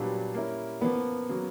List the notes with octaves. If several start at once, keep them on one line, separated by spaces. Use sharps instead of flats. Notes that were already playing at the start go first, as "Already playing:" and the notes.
Already playing: A#2 F#3 G3 B3 D4
A#3 C#4 E4
C#3 F3 A#3 B3
C#3 F#3 A#3